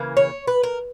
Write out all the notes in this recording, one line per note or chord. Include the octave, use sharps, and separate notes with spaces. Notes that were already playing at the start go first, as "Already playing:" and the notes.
Already playing: C#3 E3 A#3
C#5
B4
A#4